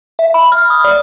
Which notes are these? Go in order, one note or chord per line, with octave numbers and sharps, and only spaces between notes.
E5
B5
F6
D#6
D5